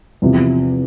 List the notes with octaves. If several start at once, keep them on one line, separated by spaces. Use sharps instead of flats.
E2 C3 F3